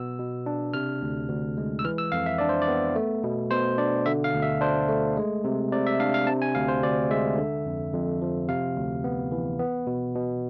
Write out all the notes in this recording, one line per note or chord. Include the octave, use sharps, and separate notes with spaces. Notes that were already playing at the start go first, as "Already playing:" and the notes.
Already playing: B2 B3 E6
B2
D4
C3 F6
D2
D2
G#3
E6
E3 F6
E6
F2 F5
E5
D4 D5
C5
D5
B3
A3
B2
B2 C5
D4 D5
D3 E5
F5
D2
E5
D4 C5
A3
G#3
C3
C3 D5
E5
D4 F5
F5
C3 A5
G#5
D2 F5
C5
D2 D5
G#3 E5
D3
F2
F2
F3
C3 F5
D2
B3
E3
B3
B2
B2